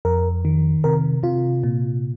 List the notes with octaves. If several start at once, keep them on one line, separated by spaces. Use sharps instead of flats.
F2 A#4
D#3
C3 A#4
C3 F4
A#2